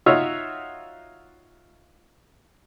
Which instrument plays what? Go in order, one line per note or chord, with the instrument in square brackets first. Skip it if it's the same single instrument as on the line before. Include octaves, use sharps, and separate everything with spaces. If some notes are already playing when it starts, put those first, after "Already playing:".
[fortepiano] D#4 F4 F#4 C#5 E5